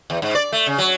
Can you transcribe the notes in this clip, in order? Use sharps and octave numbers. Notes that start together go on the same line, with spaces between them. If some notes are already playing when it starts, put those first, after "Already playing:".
E2
G#2
D5
A3
C#3
F#3